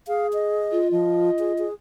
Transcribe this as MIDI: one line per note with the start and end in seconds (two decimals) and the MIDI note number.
0.08 0.81 68
0.08 0.27 77
0.33 0.88 75
0.71 1.64 65
0.92 1.30 53
0.92 1.68 75
1.39 1.53 68
1.58 1.73 68